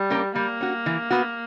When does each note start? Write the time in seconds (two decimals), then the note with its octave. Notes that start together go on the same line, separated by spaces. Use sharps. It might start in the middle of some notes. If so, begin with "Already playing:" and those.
Already playing: G3
0.10 A#3 C#4 G4 A#4
0.36 G3 A#3
0.61 C#4 F#4
0.86 E3
1.11 B3 F#4